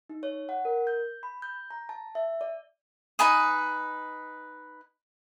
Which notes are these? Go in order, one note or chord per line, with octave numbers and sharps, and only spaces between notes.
D#4
C#5
F#5
A#4
G6
B5
G6
A#5
A5
E5
D5
D#4 B4 G#5 D#6